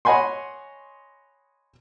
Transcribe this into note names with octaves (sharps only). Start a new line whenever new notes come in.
C#5 D#5 F#5 G#5 B5 C6